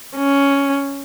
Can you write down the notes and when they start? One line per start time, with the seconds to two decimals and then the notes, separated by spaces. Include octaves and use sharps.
0.18 C#4